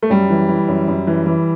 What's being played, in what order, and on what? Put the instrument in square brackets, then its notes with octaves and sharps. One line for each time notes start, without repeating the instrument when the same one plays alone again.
[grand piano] A3
F#2 G3
E3
E3
F#2
F#2
E3
E3